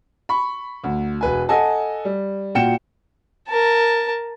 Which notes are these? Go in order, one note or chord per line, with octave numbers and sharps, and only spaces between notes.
B5 C#6
D2
E1 B4 G#5
A4 D#5 F#5 G#5 A5
G3
A#2 F#4 G5 C#7 E7
A#4 A5